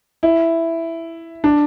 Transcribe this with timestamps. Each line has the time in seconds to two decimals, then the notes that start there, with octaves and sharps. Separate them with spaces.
0.23 E4
1.44 D4